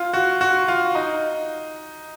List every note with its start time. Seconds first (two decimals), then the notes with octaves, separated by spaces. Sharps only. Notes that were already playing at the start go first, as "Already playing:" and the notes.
Already playing: F4
0.13 F#4
0.41 F#4
0.68 F4
0.95 D#4